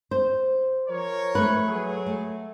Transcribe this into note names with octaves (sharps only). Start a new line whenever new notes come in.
C5
F3 A#4 C#5
A3 B4
F#3 G#4
A3